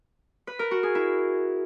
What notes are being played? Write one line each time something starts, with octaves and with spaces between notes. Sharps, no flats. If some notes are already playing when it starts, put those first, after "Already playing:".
B4
A#4
F#4
G#4
E4